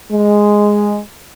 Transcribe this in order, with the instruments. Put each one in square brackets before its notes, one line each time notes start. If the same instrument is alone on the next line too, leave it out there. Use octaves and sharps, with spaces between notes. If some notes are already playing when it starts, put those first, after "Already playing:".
[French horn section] G#3